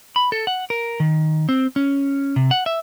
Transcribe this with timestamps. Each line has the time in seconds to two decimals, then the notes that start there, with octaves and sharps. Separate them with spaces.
0.16 B5
0.32 A4
0.47 F#5
0.70 A#4
1.00 D#3
1.49 C4
1.76 C#4
2.36 C3
2.51 F#5
2.66 E5